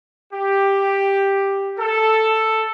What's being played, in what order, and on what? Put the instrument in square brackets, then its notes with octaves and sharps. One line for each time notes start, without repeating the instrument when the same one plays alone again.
[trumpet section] G4
A4